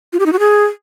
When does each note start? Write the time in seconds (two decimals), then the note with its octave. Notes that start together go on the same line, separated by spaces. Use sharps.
0.13 F4
0.19 G4
0.26 D#4
0.33 F#4
0.39 G#4